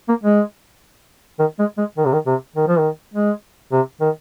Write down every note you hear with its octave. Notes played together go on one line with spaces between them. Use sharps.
A#3
G#3
D#3
G#3
G#3
D#3
C3
D#3
C3
D#3
F3
D#3
G#3
C3
D#3